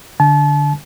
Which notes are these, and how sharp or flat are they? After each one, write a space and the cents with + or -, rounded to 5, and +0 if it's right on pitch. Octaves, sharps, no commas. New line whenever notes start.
D3 -10 A5 -35